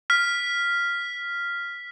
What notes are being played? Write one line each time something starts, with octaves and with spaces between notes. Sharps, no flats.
F6 B6